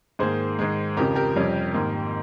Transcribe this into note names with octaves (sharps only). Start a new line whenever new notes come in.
G#2 D#3 A#3 G#4 C5
G#2 D#3 G#3
F2 C#3 F3 G4 A#4
G4 A#4
F2 C3 G3 C#4
G#2 D#3 A#3